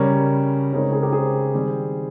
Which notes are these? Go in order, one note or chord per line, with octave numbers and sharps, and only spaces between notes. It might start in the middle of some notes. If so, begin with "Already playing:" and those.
Already playing: C#3 G3 C#4 A#4 C#5
C#3 G#3 C4 D#4 A#4 C#5
G#4
G4 A#4
G#4 C5
D#3 G3 C4